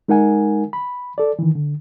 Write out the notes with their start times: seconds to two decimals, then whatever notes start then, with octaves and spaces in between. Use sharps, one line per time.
0.08 G#3 D#4 A#4 F#5 G#5
0.73 B5
1.18 A4 D5
1.39 D#3 E3
1.55 D3